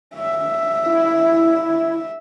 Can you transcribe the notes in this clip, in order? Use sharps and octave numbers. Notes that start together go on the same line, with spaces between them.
E5
E4